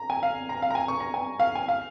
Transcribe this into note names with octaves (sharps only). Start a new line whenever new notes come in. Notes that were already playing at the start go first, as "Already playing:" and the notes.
Already playing: A#5
G#5
F5
A#5
F5
A#5
G#5
C#6
A#5
G#5
F5
G#5
F5